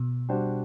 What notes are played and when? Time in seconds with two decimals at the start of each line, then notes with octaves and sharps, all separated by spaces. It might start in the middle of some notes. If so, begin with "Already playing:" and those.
Already playing: B2
0.29 G3 D4 F#4 C5